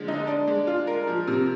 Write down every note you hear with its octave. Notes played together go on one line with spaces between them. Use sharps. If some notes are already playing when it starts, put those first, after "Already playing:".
Already playing: D3 F3 G#3
D#4
D4
G#3
F4
A#4
F3
C3